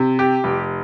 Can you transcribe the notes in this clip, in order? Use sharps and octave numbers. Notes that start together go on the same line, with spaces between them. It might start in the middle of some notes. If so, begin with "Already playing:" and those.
Already playing: C3
G4
F1